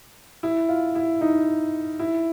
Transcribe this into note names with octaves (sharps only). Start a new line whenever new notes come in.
E4
F4
E4
D#4
E4